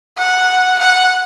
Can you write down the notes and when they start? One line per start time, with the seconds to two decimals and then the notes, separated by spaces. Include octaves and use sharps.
0.17 F#5
0.79 F#5